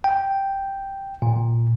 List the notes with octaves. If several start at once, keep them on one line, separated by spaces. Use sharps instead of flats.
G5
A#2